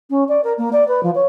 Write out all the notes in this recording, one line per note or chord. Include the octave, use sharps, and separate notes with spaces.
C#4
D5
A#4
A#3
D5
B4
F3
C#5